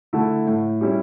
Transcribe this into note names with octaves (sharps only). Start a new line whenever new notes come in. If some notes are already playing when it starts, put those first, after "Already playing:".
D3 A3 E4
A2
G3 C#4 E4